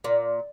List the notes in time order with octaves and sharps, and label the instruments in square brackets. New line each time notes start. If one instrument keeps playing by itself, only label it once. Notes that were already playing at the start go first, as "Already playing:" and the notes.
[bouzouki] A#2